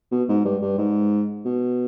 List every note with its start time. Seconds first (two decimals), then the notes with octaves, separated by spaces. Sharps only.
0.12 B2
0.29 G#2
0.45 G2
0.62 G2
0.78 G#2
1.45 B2